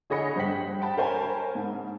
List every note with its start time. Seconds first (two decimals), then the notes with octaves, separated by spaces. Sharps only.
0.10 D3 G#4 C#5 D#5 B5 C#7
0.36 G2 C5 F#5 G5 B6 F#7
0.82 G5 A5 B5
0.97 A#4 C5 C#5 G#5 A5 B5
1.55 G#2